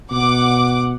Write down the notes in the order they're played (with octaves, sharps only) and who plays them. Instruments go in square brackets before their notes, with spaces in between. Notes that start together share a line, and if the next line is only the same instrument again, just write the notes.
[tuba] B2 [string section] F#5 D6